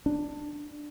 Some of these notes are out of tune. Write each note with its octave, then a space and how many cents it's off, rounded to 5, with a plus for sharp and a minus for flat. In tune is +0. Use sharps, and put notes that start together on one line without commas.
D4 +10